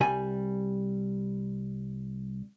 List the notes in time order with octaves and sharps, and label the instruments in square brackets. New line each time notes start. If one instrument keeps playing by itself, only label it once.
[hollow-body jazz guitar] C2 G3 G#5